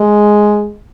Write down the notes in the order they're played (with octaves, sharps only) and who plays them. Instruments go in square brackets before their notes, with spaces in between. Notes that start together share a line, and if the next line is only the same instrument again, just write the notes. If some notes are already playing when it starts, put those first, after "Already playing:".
Already playing: [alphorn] G#3